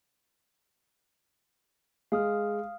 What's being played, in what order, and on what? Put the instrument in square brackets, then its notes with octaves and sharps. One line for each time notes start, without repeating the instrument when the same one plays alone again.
[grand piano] G#3 [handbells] F5 D#6 F6